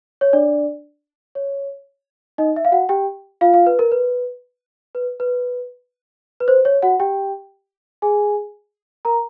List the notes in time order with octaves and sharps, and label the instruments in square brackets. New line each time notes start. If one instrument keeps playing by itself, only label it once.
[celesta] C#5
D4 D5
C#5
D#4 D#5
E5
F5
F#4 F#5
G4 G5
F4 F5
F4 F5
B4
A#4
B4
B4
B4
B4
C5
C#5
F#4 F#5
G4 G5
G#4 G#5
A#4 A#5